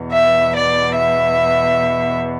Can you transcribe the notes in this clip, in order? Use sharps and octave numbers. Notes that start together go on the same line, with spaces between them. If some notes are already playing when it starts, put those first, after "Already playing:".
Already playing: E2 B2
E5
D5
E5